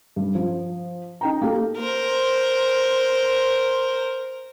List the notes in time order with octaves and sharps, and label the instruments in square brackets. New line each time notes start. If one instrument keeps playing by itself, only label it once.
[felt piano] G2
F3
D#4 G5 A#5
A#3 G4 A4
[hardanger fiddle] A#4 C5